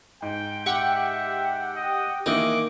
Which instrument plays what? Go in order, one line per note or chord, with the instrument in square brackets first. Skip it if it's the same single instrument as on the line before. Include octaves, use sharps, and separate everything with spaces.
[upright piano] G#2 [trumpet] G5
[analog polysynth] G4 F#5 G5 [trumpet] E5 [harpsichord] C#6
[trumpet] D#5
[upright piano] D#3 A#3 [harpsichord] E3 D#4 [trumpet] D6